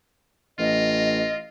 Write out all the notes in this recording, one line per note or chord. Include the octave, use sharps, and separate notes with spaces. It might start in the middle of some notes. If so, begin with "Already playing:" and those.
A1 F4 D#5